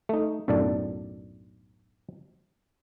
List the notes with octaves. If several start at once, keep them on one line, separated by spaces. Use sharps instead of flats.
A3 D#4
B1 F#2 A2 D4 D5